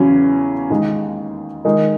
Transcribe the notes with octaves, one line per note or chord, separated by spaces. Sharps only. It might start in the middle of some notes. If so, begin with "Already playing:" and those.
Already playing: E2 C#3 F#3 C#4
D#2 D#3 G#3
D#3 G#3 D#4 A#4